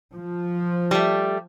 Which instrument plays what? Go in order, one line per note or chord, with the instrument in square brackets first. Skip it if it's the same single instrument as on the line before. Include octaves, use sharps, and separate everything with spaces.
[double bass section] F3
[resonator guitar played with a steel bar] G3 A3